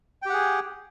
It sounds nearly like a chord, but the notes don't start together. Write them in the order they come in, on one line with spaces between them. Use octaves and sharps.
G5 G4 F#5 G#4